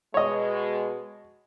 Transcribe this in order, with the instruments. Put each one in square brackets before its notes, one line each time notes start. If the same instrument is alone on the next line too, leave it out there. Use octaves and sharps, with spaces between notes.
[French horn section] B2 G#3 [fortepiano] C#5 D#5